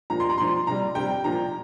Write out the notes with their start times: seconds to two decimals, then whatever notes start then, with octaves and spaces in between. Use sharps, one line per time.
0.10 A#2 F3 A#5
0.20 C6
0.29 A#5
0.38 A#2 F3 C6
0.67 C3 G3 A#5
0.95 C3 G3 G5
1.24 A#2 F3 A#5